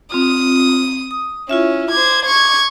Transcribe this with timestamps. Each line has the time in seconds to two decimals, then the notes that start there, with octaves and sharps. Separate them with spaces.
0.12 C4 F4 D#6
1.11 D#6
1.49 C#4 E4 F4 E5
1.91 C5 D6 G#6
2.25 C#6 G#6